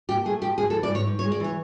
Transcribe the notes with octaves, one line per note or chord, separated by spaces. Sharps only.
A#2 G4
A3 G#4
F3 G4
G#3 G#4
A4
E3
D5
G#2 C#5
G#2
C#5
G#3
D5
E3 C#5